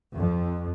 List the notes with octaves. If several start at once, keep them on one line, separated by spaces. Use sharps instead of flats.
F2